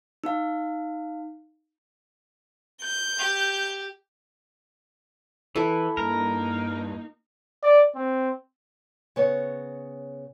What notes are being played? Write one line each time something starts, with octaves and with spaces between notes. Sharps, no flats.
D#4 F5
G6
G4
E3 E4 A4
G2 A#3 D#4 A#4
D5
C4
C#3 B3 C#5